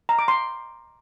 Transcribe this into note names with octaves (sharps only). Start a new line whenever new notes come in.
A#5
D6
C6